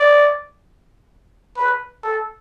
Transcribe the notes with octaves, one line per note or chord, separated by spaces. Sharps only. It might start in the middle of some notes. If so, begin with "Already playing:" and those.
Already playing: D5
B4
A4